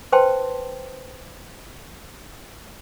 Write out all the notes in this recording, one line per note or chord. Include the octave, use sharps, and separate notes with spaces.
B4 C5 G5 A5 C6